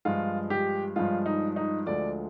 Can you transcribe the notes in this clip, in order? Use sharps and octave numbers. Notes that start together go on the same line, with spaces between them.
G2 F3 G#3 F4
G4
G2 F3 G#3 F4
D#4
D#4
D2 D3 F3 G#3 D5